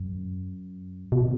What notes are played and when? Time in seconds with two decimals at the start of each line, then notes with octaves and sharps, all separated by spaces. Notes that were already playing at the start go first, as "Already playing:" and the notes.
Already playing: F#2
1.12 B2